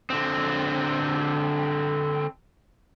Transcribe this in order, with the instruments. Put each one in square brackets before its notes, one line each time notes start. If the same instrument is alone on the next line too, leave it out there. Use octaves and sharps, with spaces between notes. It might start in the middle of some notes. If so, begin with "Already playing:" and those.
[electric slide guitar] D3 C4